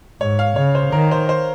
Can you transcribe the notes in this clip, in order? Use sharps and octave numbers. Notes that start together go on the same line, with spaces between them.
G#2 C#5
F5
C#3 C#5
C5
D#3 A#4
C5
C5